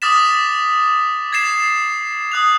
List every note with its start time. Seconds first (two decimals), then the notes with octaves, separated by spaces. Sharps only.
0.02 D6 D#6 F6 A6 B6 E7
1.33 G#6 A6 C7 E7
2.32 D#6 F#6 F7